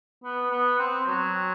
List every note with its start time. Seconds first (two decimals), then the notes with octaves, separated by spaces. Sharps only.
0.24 B3
0.51 B3
0.79 C4
1.06 F#3